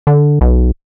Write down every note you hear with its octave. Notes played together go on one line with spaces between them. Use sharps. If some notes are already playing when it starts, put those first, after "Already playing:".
D3
B1